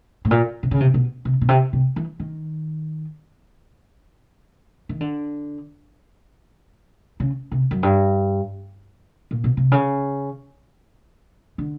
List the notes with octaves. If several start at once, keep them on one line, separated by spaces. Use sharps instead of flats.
A2
A#2
C3
C#3
C3
B2
C3
B2
C3
C3
E3
D#3
D#3
D3
C#3
C3
F#2
G2
A#2
B2
C3
C#3
D3